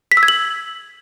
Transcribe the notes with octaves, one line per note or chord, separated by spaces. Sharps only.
B6
E6
G#6
F#7